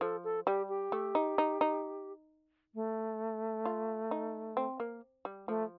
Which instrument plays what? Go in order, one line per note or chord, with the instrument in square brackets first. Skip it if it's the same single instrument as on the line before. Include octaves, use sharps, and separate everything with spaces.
[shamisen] F3 [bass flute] A4
[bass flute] A4
[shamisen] G3 [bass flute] G4
[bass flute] G4
[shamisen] A3
D#4
D#4
D#4
[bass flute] A3
[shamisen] F4
D#4
C4
A#3
G3
[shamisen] F3 [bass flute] A3